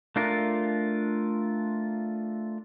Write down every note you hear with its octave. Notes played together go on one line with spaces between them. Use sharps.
A3 D4 F4 A#4